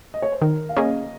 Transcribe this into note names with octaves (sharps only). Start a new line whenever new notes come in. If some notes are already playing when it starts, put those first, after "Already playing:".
D#5
C#5
C5
D#3 A#4
F5
A#3 C#4 G#4 D#5